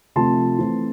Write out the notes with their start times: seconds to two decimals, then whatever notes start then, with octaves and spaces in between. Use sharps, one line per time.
0.16 C3 F3 A3 C4 A5 C6
0.59 E3 A3 C4